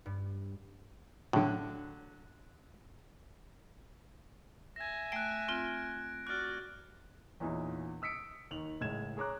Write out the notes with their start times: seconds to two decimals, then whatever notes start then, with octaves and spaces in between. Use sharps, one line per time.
0.06 G2
1.33 A2 D3 F#3
4.76 E5 G#5 G#6 A#6
5.12 A3 G5 F#6 D7
5.48 C4 F4
6.27 F#4 D5 F6 F#6
7.40 E2 A#2 E3 C#4 D#4
8.02 D#6 E6 B6 C#7 D7
8.51 D#2 D#3 F7 F#7
8.80 F#1 A2 G#3 G#6 E7
9.17 G#4 C#5 A#5 D6 F#6